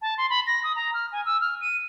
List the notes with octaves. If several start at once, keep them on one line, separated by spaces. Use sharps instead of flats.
A5
C6
B5
A#6
D#6
A#5
F6
G#5
E6
F6
D#7